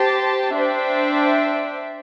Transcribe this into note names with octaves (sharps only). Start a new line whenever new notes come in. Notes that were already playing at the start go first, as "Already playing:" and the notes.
Already playing: G4 C5 A5
D4 C5 E5 G5